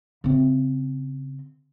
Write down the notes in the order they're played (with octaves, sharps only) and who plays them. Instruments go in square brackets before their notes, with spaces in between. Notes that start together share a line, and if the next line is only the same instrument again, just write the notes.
[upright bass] C#3 C4